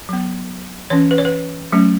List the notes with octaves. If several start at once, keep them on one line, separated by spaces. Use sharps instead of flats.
F#3 B3
E3 C#4 C#5
B4
C#5
B4
F#3 A3 C#4